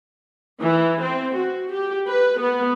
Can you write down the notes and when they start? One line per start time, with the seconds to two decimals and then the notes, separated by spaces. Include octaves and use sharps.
0.61 E3
1.02 C4
1.36 F#4
1.71 G4
2.08 B4
2.40 B3